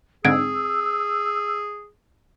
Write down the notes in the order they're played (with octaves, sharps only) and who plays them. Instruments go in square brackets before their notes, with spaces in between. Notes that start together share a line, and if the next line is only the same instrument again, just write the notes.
[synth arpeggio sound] G#2 D3 [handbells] C4 G#6 D7 [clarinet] G#4 [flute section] E6